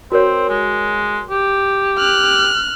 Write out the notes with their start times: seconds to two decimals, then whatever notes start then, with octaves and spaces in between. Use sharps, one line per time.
0.12 C4 F#4 A#4 C#5
0.49 G#3
1.30 G4
1.98 F6 F#6